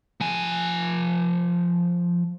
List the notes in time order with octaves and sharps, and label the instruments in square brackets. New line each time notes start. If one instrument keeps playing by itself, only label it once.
[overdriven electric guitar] F3 G#5